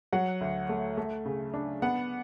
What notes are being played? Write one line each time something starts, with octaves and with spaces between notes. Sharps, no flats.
F#3 F#5
D2
A3
A3
C#3
D4
B3 F#5